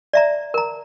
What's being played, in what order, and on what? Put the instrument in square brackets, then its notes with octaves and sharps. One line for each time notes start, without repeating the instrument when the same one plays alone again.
[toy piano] D5 E5 A#5
A#4 A#5